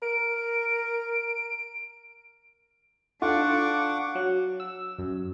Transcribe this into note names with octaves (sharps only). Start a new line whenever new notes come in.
A#4 D7
D4 F4 A4 F5 F#5 C#6 D6
F#3
E6
F#2